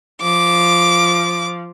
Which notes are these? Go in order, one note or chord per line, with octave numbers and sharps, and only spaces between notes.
F3 D6